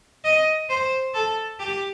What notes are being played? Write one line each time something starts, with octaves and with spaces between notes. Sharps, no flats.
D#5
C5
A4
G4